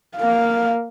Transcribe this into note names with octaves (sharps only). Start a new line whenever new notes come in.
A#3 F5